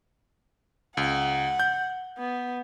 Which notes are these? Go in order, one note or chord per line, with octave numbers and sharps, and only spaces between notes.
C#2 F#5
G6
B3